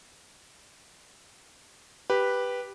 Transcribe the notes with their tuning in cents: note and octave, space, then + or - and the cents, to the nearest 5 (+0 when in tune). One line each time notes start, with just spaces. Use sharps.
G4 +0 B4 -5